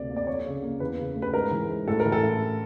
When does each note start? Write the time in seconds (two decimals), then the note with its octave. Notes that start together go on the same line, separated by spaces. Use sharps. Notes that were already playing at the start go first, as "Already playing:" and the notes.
Already playing: D2 C3 D5
0.10 A#3
0.16 D5
0.27 F2 C#5
0.46 C#3
0.62 A#3
0.80 E2 B4
0.99 C#3
1.16 A3
1.22 B4
1.34 G#2 A#4
1.51 E3
1.69 G#2
1.88 A2 A4
2.00 A#4
2.05 E3
2.12 A4
2.23 A2